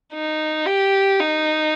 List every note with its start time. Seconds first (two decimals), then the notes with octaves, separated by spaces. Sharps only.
0.13 D#4
0.66 G4
1.19 D#4